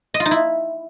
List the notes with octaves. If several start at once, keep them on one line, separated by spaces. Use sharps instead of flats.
D#5
F4
D#4
E4